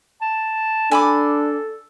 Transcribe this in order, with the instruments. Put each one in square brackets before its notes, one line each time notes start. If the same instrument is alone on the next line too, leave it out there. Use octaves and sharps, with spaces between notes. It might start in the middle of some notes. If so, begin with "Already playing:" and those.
[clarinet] A5
[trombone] D4 [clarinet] A4 [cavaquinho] G#5 B5 D6